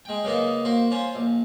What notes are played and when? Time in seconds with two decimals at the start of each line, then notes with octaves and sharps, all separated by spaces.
0.05 G#3 G5
0.24 C#3 F#3 A#3 B3 D#4
0.65 A#3 F#4 C5
0.91 C#4 F4 C5
1.15 A#1